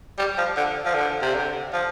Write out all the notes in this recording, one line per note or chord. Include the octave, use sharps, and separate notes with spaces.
G3
F3
D3
F3
D3
C3
D3
F3